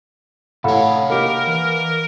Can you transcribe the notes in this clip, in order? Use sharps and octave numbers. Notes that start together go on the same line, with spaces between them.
A1 C3 A4 C#5 F5 F#5 B5
A#3 D#4 G4 A#4
E3